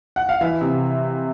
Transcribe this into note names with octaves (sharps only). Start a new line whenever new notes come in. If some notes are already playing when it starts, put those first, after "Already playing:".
F#5
F5
E3 E5
C3